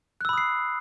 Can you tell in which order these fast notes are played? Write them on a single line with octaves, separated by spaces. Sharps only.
F#6 E6 B5 D#6 C7